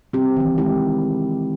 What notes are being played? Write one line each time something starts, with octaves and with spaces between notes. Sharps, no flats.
C4 G4
D#3 E3
G#3 E4 G4